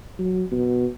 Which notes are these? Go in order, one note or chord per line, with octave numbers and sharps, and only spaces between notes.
F#3
B2